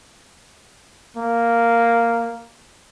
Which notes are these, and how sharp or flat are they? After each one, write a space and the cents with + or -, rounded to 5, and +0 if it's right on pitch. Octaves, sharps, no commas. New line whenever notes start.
A#3 -5